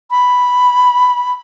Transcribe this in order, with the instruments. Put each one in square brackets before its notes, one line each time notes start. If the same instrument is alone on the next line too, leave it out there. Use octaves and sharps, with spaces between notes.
[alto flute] B5